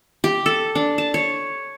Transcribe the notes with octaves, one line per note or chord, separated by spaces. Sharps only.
G4
A4
D4
A5
C#5